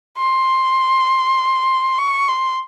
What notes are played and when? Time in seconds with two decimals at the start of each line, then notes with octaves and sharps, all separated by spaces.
0.18 C6
1.98 C#6
2.28 C6